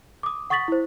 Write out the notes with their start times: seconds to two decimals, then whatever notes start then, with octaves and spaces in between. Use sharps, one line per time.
0.23 D6 D#6
0.50 F#5 C#6 D#6 A6 B6 F#7
0.68 E4 C5